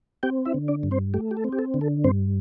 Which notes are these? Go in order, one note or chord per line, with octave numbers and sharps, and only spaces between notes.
C4 G4 G5
E4 E5
D3
D4 D5
G2
C4 C5
A3 G4
G4
A4
C4
G4
A4
D3
A4
G2 C4 C5